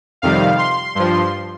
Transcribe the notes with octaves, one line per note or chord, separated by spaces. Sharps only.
F2 C3 D#3 G3 F5
C6
G2 F3 C6